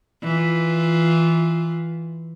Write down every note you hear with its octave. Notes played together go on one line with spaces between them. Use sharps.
E3 F4